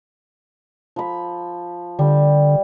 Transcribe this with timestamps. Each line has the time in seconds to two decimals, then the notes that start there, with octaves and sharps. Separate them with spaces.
0.96 F3 B5
1.99 D3 G3